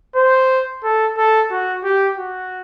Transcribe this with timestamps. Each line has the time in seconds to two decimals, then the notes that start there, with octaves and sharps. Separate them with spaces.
0.16 C5
0.84 A4
1.18 A4
1.51 F#4
1.84 G4
2.18 F#4